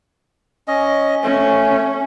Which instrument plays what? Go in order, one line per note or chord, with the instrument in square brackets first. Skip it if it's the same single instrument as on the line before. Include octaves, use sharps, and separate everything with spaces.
[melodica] C#4 D#5
[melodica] A3 [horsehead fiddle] C#4